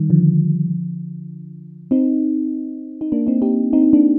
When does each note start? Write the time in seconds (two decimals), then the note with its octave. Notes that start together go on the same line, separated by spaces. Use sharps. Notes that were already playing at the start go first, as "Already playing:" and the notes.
Already playing: D#3 G3
0.10 D3 F3
1.91 C4 D#4
3.01 D#4
3.12 A#3 D4
3.27 C4 D#4
3.42 D#4 G4
3.73 C4 D#4
3.93 A#3 D4